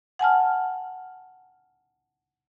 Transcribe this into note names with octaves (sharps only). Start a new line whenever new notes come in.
F#5 G#5 A5 F6